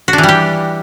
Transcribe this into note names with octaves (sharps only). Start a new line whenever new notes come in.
F#4
D4
E3
G3
G4